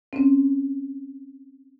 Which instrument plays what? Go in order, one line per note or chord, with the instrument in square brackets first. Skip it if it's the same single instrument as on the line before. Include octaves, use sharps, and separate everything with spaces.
[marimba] C4 C#4